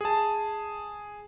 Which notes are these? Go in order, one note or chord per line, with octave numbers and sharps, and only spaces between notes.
G#4 A5